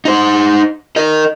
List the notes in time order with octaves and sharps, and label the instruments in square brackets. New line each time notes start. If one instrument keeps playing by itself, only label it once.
[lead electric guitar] D#4 C5
A#4 D#5